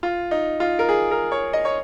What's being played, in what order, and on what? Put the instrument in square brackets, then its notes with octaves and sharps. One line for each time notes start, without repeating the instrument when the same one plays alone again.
[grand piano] F4
D#4
F4
A#4
G#4
A#4
C#5
D#5
C#5